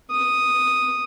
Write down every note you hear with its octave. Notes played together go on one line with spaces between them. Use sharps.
D#6